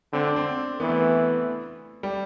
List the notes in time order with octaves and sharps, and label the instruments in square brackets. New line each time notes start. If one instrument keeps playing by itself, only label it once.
[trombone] D3 [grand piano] C4
[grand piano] D4
C4
[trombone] E3 [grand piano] B3
[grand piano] A3
B3
G3